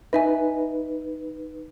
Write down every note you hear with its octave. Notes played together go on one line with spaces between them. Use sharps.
D#4 B4 D#5 E5 G#5